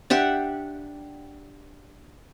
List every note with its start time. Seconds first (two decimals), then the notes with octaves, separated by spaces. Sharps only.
0.10 D4 G4 E5 F#5